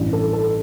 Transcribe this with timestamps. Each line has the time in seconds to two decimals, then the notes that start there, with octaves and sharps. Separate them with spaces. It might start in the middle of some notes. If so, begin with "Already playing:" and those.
Already playing: A1 G2 E3
0.13 A4
0.33 A4